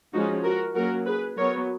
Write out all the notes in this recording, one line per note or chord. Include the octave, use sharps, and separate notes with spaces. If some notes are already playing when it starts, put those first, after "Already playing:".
F3 G#3 C#4 D#4 F#4
F#4 A#4
F#3 A#3 C#4 F#4 A#4
G#4 B4
F#3 B3 A#4 C#5